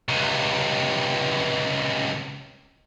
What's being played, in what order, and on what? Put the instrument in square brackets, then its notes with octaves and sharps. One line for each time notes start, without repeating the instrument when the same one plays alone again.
[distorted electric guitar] C#2 C3